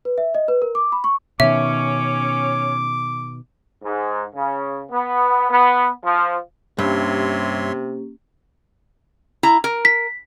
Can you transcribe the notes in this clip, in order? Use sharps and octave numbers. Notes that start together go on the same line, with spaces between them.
B4
E5
D#5
B4
A#4
D6
B5
C#6
B2 D#3 C#4 C#5 E5 D6
G#2
C#3
B3
B3
F3
G2 C3 A#3 C#4 G4 C#5 E5 C6
E4 A#5
A#4
B6